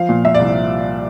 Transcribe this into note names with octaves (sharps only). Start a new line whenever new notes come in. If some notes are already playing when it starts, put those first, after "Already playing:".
Already playing: F3 F5
A#2
A#2 E5
D5
C2